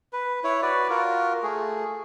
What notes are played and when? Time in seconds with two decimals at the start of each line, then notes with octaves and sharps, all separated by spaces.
0.13 B4
0.44 E4 C#5
0.62 F#4 B4 D5
0.90 F4 F#4 A#4
1.43 A3 G#4